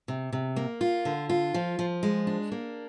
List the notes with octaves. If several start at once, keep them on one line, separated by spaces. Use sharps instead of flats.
C3
C3
A#3
F4
D3
F4
F3
F3
G#3
D4
A#3